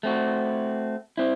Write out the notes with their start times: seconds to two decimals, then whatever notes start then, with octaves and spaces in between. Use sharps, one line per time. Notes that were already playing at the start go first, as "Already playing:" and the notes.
0.03 A3 C4 F#4
1.18 C4 E4